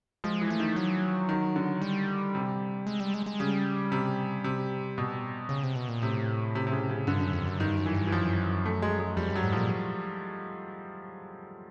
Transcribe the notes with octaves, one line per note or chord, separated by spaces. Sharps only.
F3 G#3
E3
A3
D#3
F#3
D#3
D3
G3
C3
G#3
G3
G#3
G#3
C#3 G3
C3
C3
B2
C#3
C3
B2
A#2
A2 C3
C3
C3
C#3
C#3
G2 D3
F#2
F2
F#2
G2 D#3
F#2
E3
G2
E3
F#2 F3
A3
G#3
G#3
F2 G3
F#2
F#3
G#2
A#2 F3